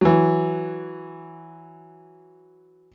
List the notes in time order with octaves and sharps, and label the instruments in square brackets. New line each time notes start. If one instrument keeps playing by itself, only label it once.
[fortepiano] E3 F#3